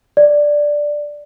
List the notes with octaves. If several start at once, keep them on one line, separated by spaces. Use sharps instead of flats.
D5